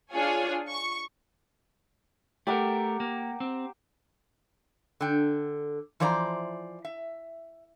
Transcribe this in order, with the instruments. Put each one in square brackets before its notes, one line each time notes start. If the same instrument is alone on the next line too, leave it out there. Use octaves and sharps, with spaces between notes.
[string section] D4 F4 G#4 C#5 G#5
C#6
[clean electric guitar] A3 A#4 [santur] G4 F#5 A#5
[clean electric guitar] A#3
C4
[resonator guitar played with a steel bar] D3 G5
E3 F3 C5 D5 A#5
E5